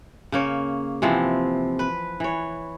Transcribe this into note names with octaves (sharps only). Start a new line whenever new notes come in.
C#3 A#3 C#5
C3 E3 F3 C4
B4
E3 C#5